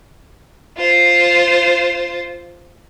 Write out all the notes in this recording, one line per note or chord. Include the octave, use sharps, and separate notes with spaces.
F4 C5